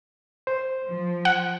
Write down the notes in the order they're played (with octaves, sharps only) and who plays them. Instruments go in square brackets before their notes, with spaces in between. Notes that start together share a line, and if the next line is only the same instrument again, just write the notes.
[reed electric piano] C5
[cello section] F3
[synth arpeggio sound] F#5